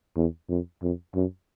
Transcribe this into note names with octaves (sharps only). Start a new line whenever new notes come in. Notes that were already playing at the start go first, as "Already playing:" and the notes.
E2
F2
F2
F#2